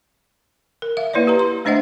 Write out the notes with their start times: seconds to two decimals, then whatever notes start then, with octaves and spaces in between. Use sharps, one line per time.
0.82 A#4
0.97 E5 F5
1.13 A#3 E4 B4 C#5 D5
1.27 G4 B4 A#5
1.39 C6
1.65 A3 D4 C5 D#5 E5 F#5